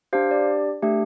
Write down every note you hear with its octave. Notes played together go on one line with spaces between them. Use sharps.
D4 G4 C5 F5
D5
A3 D4 G4